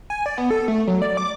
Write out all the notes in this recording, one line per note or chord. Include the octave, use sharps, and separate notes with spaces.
G#5
D5
B3
A4
A3
F#3
D5
D6